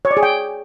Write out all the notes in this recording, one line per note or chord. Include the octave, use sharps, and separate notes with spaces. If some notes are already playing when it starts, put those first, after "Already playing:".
C#5
D5
G#4
G5